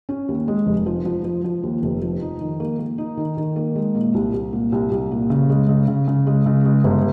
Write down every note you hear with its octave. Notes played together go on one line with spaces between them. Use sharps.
C#4
D#2
G#3
F1
F3
F3
F3
F3
D#2
F1
F3
D#4
D#3
A#3
A#3
D#4
D#3
D#3
A#3
G#3
A#2
C2
C2
A#2
C2
C2
A#2
C#3
G#3
C#3
C#3
C#3
G#3
C#3
G#3
G1